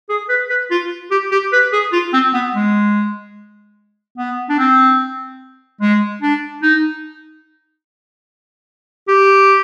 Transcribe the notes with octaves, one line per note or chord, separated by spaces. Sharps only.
G#4
B4
B4
F4
G4
G4
B4
G#4
F4
C4
B3
G#3
B3
D4
C4
G#3
D4
D#4
G4